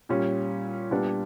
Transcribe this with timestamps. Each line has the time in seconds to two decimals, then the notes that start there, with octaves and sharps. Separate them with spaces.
0.09 A#2 G3 C#4
0.91 A#2 G3 B3 D4